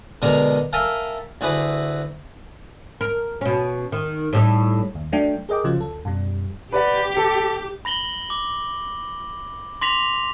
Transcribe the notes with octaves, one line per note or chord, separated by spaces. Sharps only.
B2 D3 G#3 A#4 A#5
A4 A#4 E5 F5 G5 G#5
D2 E4 F#4 G#4 B4 B5
A#4
B2 C#4
D#3
A2 G3 D#4
D#2
F#3 A3 D4 G5
G#4 A#4 D#5 G5 D6
C#3 F3 F#3 F4
D2 A4
F#2 B2 G3
G4 B4 D5 F#5
A4
B5 A#6 F#7 G7
D6
C6 D6 A#6 B6 F7